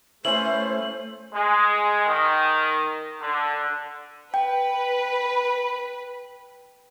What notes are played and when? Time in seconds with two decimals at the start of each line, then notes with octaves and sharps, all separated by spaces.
0.25 A3 C#4 E4 B4 C5 F#7
1.34 G#3
2.07 D#3
3.21 D3
4.34 B4 G5